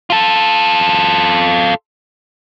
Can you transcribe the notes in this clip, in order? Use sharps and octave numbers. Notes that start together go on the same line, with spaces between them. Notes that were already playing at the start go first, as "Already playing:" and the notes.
F4 A4